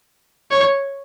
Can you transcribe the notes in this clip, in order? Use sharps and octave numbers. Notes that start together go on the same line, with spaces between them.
C#5